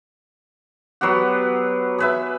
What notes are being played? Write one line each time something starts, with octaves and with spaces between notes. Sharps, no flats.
F#3 B3 G4 F#5
G#4 B4 E5